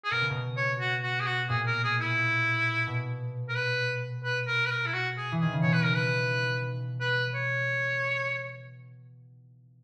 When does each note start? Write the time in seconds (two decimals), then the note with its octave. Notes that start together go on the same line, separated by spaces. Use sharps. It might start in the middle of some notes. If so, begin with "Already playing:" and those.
0.05 G#4
0.11 B2 A#4
0.21 C#3
0.30 B2
0.57 C#5
0.80 F#4
1.03 F#4
1.20 G#4
1.26 F#4
1.49 A#2 G#4
1.67 A#4
1.84 G#4
2.01 E4
2.87 B2
3.49 A#4
3.56 B4
4.24 B4
4.47 A#4
4.66 B4
4.71 A#4
4.86 E4
4.94 F#4
5.17 G#4
5.32 E3
5.40 D#3 G#4
5.52 C#3
5.62 B2 C#5
5.73 B4
5.84 A#4
5.95 B4
7.01 B4
7.35 C#5